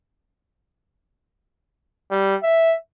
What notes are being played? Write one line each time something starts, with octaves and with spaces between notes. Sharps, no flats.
G3
E5